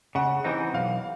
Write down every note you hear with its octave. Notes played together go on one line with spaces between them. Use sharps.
C#3 F#5
E3 G3 C4 D#4
B1 F5